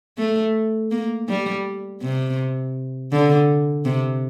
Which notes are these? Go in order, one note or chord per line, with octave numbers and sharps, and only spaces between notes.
A3
A#3
G3
C3
D3
C3